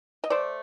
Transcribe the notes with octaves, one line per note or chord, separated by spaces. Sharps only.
D#5
A3 C5 D5